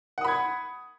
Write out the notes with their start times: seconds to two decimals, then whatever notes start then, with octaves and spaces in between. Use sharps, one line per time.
0.18 F#5
0.21 D#6
0.25 B5
0.28 G#6